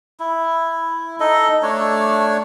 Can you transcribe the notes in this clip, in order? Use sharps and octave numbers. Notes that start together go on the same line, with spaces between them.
E4
D#4 A4 D#5
A3 D4 C#5